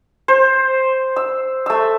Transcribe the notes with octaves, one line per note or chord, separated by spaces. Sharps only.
C5
E6
A3 E6